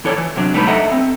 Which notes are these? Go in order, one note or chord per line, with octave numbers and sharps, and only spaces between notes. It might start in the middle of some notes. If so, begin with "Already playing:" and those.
E3 E4 A4 C#5 D5
E3
C3 F#3 D4
D#2 G3 A3 D#4 B4 B5
A4 D#5 E5 F#5 A#5
C4